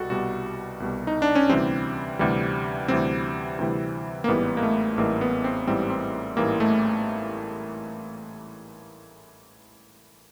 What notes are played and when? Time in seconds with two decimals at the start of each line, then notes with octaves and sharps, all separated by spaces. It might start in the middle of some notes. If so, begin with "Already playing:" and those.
Already playing: C2 B2 G3 F#4 A4
0.10 C2 B2 G3 F#4
0.80 C2 B2 G3
1.07 D#4
1.22 D4
1.35 C#4
1.49 D2 C3 E3 G3 C4
2.19 D2 C3 E3 G3
2.88 D2 C3 E3 G3 C4
3.59 D2 C3 E3 G3
4.24 A#3
4.28 A1 G#2 E3 G3 B3
4.57 A#3
4.63 A3
4.98 A1 G#2 E3 G3 A#3
5.21 B3
5.44 C4
5.67 A1 G#2 E3 G3 C4
5.90 C4
6.37 A1 G#2 E3 G3 A#3
6.60 A3